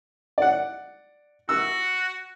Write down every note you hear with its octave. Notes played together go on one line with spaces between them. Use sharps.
D5 F#5
F#4 E6